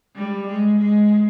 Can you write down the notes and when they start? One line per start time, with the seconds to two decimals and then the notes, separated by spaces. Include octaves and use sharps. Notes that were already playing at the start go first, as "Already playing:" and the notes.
0.16 G3
0.47 G#3
0.79 G#3